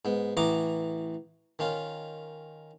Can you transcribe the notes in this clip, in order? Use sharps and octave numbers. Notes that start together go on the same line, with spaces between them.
G#2 B3
A1 E3 F#4 A#5 D6 D#6
D#3 C#4 F4